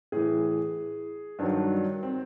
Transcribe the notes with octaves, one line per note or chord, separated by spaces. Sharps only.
A2 E3 G#4
G2 D#3 F#3 D4
C4